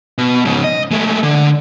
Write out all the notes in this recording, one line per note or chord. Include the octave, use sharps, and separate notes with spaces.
B2
G#2 C#3
D#5
G#3 A3
D3